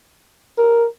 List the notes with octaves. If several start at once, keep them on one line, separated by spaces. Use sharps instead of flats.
A#4